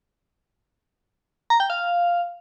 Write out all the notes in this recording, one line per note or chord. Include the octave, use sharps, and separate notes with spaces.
A#5
G5
F5